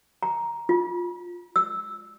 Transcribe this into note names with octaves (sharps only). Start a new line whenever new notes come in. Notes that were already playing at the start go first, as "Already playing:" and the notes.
A#5
F4
E6